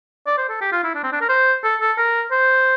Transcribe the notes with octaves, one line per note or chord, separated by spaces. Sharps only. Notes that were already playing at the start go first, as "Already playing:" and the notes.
D5
C5
A4
G4
F4
E4
D4
C4
D4
A#4
C5
A4
A4
A#4
C5